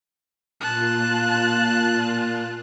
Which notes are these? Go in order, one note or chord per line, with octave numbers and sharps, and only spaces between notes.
A#2 F4 A5 F#6